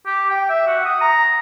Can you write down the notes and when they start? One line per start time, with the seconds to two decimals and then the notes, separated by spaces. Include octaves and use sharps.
0.06 G4
0.31 G5
0.49 E5
0.67 F#4
0.85 D#6
1.01 A#5